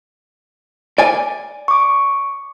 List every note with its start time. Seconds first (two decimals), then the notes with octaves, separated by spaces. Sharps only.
0.98 D5 G#5
1.68 C#6 D6